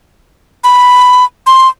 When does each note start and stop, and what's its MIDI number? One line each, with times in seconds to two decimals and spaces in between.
0.64 1.24 83
1.47 1.68 84